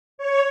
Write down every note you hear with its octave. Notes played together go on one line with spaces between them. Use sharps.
C#5